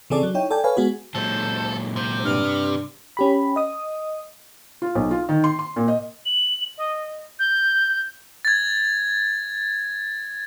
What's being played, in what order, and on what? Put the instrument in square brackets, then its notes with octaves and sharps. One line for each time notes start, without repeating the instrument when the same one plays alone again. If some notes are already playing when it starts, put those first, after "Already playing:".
[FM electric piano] C#3 E3 C4 G#4 A4 D5
F#3
D#4 E4 C#5 G5
A4 D5 G5 G#5
A4 B4 C#5 F5 G#5
G#3 B3 F#4 G#4
[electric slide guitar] A#2 F#3 G#3 [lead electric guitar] A4 [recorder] C5
[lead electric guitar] C3 [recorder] C5
[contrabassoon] G2 [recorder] F6
[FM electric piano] C#4 G4 B5
D#5 D#6
[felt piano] F4
B1
F4
D#3
C6
C6
A#2
D#5
[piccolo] F#7
D#5
G6
[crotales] G#6 A6